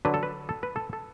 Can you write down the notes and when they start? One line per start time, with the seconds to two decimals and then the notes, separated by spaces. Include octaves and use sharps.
0.05 D3 F#3 D4 B4
0.14 A4
0.23 B4
0.49 A4
0.63 B4
0.76 A4
0.93 A4